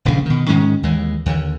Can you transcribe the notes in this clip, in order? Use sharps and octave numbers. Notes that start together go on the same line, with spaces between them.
D#1 A#1 G#2 C#3
B2 D#3
G#2 D#3 G#3 C#4
D#2 E3 G#3
D#2 D3